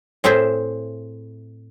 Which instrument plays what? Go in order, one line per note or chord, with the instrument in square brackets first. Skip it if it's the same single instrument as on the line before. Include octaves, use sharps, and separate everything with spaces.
[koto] A2 C4 G#4 C5 E5